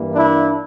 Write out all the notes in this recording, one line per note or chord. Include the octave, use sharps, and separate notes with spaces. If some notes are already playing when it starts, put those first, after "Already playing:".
Already playing: G2 E3 G3 A#3
D4 E4